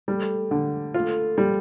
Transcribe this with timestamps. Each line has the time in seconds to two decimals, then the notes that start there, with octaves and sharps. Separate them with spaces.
0.08 G3 A3
0.51 D3
0.94 A3 F4
1.38 G3